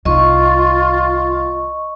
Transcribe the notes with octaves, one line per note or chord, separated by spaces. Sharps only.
C2 D#3 F4 D#5 C#6